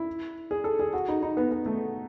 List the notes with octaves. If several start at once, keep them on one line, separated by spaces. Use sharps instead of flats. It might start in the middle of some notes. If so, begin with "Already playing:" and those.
Already playing: E4
G#4
A4
G#4
F#4
D#4
D#4
B3
B3
A3